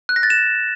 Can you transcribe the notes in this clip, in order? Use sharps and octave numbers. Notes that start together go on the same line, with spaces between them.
F#6
A#6
A6
E7